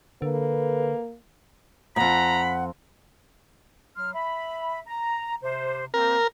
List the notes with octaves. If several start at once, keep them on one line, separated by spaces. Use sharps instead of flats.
D3 A#3 A4 B4
F2 G#2 F#5 A#5 B5
F#3 C6 F6
E5 B5
A#5
C3 C5
A#3 C4 A#4